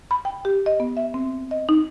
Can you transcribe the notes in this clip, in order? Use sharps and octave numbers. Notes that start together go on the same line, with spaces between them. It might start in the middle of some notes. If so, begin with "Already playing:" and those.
B5
G5
G4
D#5
B3
E5
C4
D#5
D#4